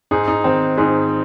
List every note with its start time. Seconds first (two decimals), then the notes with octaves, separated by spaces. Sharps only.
0.11 G#2 D#4 G#4
0.28 D#4
0.44 D#3 C4
0.77 G#2 D#4 G#4